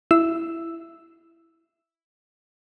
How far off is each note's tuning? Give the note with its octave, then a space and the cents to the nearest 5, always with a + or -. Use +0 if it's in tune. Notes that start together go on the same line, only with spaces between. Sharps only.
E4 +10 E6 +0